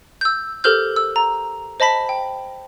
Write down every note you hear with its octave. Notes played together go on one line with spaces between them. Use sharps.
E6 G6
G4 A4 A#4 C5 F6 G6
E6
A#5
C5 D#5 A5 B5 B6
G5